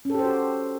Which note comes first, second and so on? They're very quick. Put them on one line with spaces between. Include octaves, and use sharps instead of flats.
C#4 A4 G4 C5 F#4